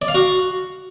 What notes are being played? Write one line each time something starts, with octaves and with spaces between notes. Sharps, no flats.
D5
F5
F#4